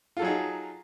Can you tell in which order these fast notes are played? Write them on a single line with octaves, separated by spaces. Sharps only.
F4 A4 F#3 G#4 D#4